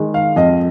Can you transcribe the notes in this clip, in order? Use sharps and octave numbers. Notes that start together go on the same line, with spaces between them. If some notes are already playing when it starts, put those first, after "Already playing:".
Already playing: D#3 G#3
F5
F2 D#5